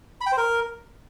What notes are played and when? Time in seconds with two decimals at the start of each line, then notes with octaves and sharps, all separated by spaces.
0.21 B5
0.26 G5
0.32 C5
0.38 A#4